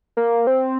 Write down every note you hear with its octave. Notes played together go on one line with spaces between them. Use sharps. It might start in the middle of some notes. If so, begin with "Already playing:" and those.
A#3
C4